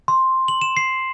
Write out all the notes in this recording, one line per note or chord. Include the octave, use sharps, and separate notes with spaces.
C6
F#7
E7
C7